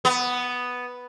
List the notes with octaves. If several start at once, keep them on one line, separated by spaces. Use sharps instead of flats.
B3